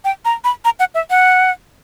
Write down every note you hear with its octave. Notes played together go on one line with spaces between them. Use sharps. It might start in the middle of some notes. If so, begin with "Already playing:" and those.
G5
A#5
B5
A#5
F#5
E5
F#5